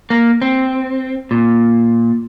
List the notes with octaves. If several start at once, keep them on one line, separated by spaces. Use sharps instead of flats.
A#3
C4
A#2